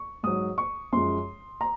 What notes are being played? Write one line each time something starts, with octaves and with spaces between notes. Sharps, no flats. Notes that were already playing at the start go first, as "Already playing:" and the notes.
Already playing: C#6
G#2 F#3 D#6
C#6
F#2 F3 G#3 C6
A#5